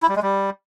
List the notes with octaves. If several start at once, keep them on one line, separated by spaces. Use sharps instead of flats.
E4
G3
G#3
G3